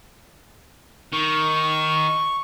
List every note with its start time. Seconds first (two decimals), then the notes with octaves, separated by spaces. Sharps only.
1.13 D#3 C#6